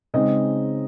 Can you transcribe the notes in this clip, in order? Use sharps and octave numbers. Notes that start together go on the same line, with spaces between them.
C#3 G#3 C4 D#4 D#5